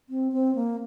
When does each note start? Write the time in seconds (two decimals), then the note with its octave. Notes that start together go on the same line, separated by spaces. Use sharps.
0.09 C4
0.32 C4
0.55 A#3